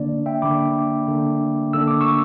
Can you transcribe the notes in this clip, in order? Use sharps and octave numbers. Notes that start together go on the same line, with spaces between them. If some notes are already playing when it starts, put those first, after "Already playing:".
Already playing: D3 A#3 D4 D5
E5 G5
D3 A#3 D4 B5 D6
D3 A#3 D4
D3 A#3 D4 E6
D6
C#6 E6